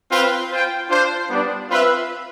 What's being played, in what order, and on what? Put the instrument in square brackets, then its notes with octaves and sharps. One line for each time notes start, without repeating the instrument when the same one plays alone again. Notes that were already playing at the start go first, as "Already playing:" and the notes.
[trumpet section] C4 F4 B4 F5
F4 C5 G5
D4 F4 C5
G3 B3 D4
C4 F4 B4 E5